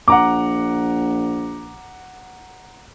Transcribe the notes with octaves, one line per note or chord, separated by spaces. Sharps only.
A#1 F#5 A#5 D6